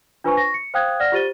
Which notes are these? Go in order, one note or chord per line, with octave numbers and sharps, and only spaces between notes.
D4 F4 B4 C5 G#5 C#6
C#6 A#6
C#7
C5 F5 G5 D#6 F#6 G#6
D5 F#5 F6 A#6
F4 G4 C5 A6 D#7 G7